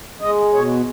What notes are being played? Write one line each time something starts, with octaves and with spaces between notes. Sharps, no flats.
G#3 D#5
B2 C#5